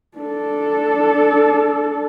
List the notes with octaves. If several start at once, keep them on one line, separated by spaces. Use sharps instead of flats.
D4 A4